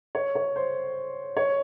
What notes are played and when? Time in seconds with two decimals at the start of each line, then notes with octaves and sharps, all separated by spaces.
0.15 C#5
0.35 C#5
0.56 C5
1.37 C#5